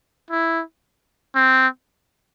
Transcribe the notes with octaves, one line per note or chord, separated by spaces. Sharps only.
E4
C4